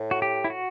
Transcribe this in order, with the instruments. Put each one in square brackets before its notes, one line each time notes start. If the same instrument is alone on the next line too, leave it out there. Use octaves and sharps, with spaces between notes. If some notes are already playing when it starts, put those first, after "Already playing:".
Already playing: [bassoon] A2
[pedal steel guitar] F#4
G4
E4
F#4